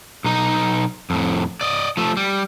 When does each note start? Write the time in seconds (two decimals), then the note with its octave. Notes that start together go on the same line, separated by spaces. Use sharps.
0.24 B1 D#4
1.10 F2 A2
1.61 D5 D#5
1.97 F3 A3
2.17 G3